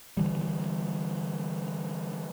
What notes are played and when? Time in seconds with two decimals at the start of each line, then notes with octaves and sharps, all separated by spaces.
0.17 D3 E3 G3